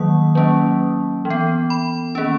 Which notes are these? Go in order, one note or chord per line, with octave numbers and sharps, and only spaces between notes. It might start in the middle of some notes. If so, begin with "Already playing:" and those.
Already playing: D#3 F#3 A#3 D#6
F#3 A#3 C#4
E3
B3
B5
D#3 A#3 C#4